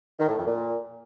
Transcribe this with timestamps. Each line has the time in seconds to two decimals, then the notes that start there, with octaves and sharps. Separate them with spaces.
0.19 D#3
0.28 A2
0.38 F2
0.47 A#2